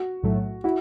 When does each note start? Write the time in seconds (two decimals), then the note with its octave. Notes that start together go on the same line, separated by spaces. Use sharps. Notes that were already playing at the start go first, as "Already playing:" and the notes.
Already playing: F#4
0.23 B1 A2 F#3 A3
0.64 E4 F#4